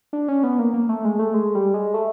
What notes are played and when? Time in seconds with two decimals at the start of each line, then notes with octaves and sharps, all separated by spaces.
0.13 D4
0.28 C#4
0.43 B3
0.59 A#3
0.74 A#3
0.89 A3
1.05 G#3
1.19 A3
1.34 G#3
1.55 G3
1.74 G#3
1.94 A3